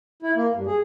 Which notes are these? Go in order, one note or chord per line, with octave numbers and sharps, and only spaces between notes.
E4
A#3
G2
G#4